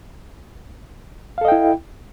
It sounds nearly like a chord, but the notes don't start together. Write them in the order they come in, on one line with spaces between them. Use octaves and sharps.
F5 A4 D#5 G5 E4